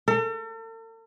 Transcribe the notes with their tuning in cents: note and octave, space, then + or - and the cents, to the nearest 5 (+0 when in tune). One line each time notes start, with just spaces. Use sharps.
A4 +45